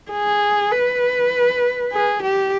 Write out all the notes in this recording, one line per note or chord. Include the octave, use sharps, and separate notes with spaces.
G#4
B4
G#4
G4